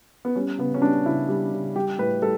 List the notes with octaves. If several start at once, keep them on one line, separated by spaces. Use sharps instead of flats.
B3
G3 C#4
C#3 B3
C#4
G3 D4
C#3 E4
G3
C#3
G3 G4
A2 B4
G3 A4